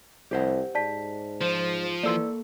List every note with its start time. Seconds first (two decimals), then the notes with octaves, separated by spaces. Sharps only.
0.31 C2 G4 C5 F#5
0.75 G#2 D5 A5 B6
1.41 F3 C5
2.03 E3 A#3 A4 D5 C6 E6